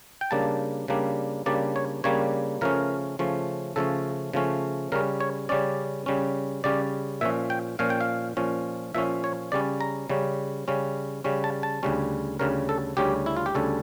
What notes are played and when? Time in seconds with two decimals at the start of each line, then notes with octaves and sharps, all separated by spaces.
0.21 G5
0.31 C#3 G3 A#3 D4 A5
0.88 C#3 G3 A#3 D4
1.46 C#3 G3 A#3 D4 D5
1.76 C#5
2.04 C#3 G3 A#3 D4 C#5
2.61 C#3 F3 A3 C#4 A#4
3.19 C#3 F3 A3 C#4
3.76 C#3 F3 A3 C#4 A4
4.33 C#3 F3 A3 C#4
4.92 C#3 G3 C#4 A#4
5.20 C#5
5.49 C#3 G3 C#4 D5
6.06 C#3 G3 C#4
6.64 C#3 G3 C#4 D5
7.21 A#2 F3 C#4 E5
7.50 G5
7.79 A#2 F3 C#4 F5
7.90 G5
8.01 F5
8.37 A#2 F3 C#4
8.94 A#2 F3 C#4 E5
9.24 C#5
9.52 C#3 G3 C#4 D5
9.81 A#5
10.10 C#3 G3 C#4
10.68 C#3 G3 C#4
11.24 C#3 G3 C#4
11.44 A5
11.63 A5
11.83 D2 C#3 G3 C#4
12.39 D2 C#3 G3 C#4 A#4
12.69 A4
12.97 D2 C#3 G3 C#4 G4
13.26 E4
13.37 F4
13.46 G4
13.55 D2 C#3 G3 C#4 A4